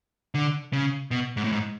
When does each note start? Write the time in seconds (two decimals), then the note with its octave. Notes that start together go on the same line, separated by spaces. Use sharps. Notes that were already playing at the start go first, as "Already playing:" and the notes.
0.35 D3
0.73 C#3
1.11 B2
1.37 G#2
1.44 A2
1.52 G#2